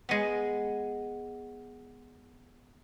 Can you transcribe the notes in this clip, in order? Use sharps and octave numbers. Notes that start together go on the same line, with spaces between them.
G#3 B3